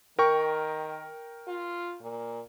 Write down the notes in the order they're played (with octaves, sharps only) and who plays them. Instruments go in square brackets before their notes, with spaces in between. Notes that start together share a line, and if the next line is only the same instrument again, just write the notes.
[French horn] D#3 [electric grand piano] A#4 G5 C#6
[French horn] F4
A#2